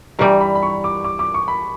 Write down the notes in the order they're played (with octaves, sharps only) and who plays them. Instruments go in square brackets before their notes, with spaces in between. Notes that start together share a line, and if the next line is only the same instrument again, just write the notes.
[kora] G2 E3 G3 [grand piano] A#5
[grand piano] B5
B5
C#6
D6
D6
D6
C#6
B5